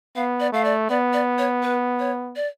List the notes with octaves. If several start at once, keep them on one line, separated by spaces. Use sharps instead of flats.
B3 F5
D5
A3 F5
D5
B3 D5
D5
C#5
B4
C#5
D5